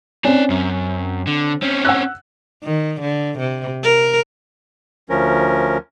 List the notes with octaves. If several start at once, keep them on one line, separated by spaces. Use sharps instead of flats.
C4 C#4 D#4 D5
F#2
D3
C4 C#4
F#5 E6 F#6
D#3
D3
C3
A#4
D2 F3 C#4 A#4